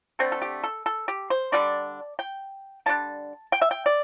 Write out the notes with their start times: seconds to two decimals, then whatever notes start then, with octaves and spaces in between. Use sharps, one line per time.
0.19 D3 A3 C4 A4
0.32 A4
0.42 G4
0.64 A4
0.86 A4
1.08 G4
1.30 C5
1.52 D3 G3 D4 D5
2.19 G5
2.86 D3 G3 D4 A5
3.52 G5
3.62 E5
3.71 G5
3.86 D5